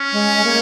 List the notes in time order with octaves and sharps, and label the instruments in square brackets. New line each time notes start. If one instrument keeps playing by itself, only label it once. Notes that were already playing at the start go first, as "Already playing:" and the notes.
Already playing: [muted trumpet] C#4
[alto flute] G#3
G#3
A#3